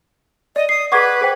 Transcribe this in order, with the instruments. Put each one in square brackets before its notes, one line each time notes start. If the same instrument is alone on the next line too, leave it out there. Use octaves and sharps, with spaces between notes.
[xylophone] D5 [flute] D#5
[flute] D#6 [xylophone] C7
[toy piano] G#4 D5 F#5 [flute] B4 [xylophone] C#6 D6 G#6
[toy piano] G#4 C5 G5